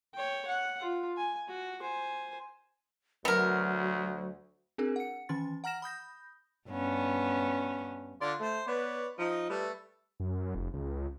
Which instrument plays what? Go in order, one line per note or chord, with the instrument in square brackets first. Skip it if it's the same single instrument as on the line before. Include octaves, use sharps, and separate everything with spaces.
[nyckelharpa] C#5 G5
F#5
F4
G#5
F#4
C5 G#5
[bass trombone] D2 [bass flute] F#3 [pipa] B3 A#4
[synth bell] C4 D4 F#4 G#4 A#4
F#5 C#7
D#3 E3 C#4 C6 A6
F#5 A#5 F6 A#6 E7
B5 D#6 G6 A#6
[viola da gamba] G2 B3 C#4
[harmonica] D3 F4 C6 [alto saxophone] D5
[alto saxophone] A3 [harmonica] C5
[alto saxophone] B3 [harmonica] B4 C#5 D5
[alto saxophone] F3 [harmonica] D#4 D#5
[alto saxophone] G3 [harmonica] A3 B4
[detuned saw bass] F#2
F1
C#2